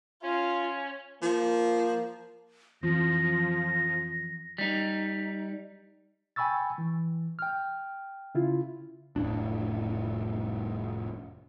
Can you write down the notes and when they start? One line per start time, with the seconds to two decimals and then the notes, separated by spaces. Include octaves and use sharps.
0.23 C#4 F4
1.22 F3 A#3
2.83 F2 E3 F3 C4 A#6
4.58 G3 D#4
6.36 G5 G#5 B5 C#6 E6 A6
6.78 E3
7.39 G5 F6
8.35 C#3 E4 F4
9.16 F1 A2 D4